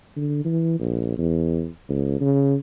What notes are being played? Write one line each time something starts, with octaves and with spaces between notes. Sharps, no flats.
D3
E3
A#1
E2
C#2
C#3